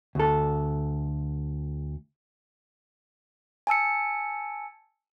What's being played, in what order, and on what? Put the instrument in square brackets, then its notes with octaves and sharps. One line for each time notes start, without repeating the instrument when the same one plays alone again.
[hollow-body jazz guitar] D2 A4
[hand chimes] G#5 A5 E6 C#7